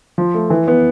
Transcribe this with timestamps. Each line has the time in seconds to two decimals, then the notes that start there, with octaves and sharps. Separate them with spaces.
0.18 F3
0.34 A3
0.50 E3
0.68 B3